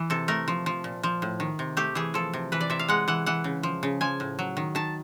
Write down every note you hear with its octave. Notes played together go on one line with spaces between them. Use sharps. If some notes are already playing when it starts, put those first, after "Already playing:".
Already playing: E3
C3 A4
A3 A#4
F3
F3
A#2
F3
A2
D#3
C3
A3 G4
E3 G#4
F3 A4
C3
E3 B4
D5
C3 E5
F5
G#3 F#5
E3 F#5
E3 F#5
C#3
F3
C#3
F3 G#5
A2
F#3
D#3
D#3 A5